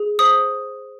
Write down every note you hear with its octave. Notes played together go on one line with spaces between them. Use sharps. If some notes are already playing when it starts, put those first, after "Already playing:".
Already playing: G#4
C5 D#6